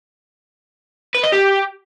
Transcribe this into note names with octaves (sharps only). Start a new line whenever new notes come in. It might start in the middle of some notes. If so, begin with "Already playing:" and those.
B4
D#5
G4